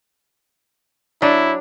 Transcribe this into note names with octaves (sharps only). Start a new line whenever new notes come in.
F#3 D4 E4